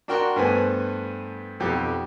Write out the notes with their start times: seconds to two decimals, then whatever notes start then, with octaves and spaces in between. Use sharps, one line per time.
0.08 D4 F#4 A#4 G5 C6 C#6
0.36 G2 A3 B3 B4 C5 G#5
1.60 B1 F2 G4 D6